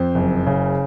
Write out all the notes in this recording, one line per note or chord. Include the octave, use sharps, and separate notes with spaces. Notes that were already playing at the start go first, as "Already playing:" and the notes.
Already playing: F2 C5
F#1
C#3